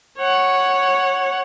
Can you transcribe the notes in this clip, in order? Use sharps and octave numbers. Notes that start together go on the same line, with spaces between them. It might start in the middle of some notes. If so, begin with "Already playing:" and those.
C#5 F#5